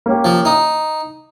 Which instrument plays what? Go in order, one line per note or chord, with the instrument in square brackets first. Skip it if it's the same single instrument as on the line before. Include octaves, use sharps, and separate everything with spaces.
[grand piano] A#3 C#4 G4
[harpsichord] F3
D#4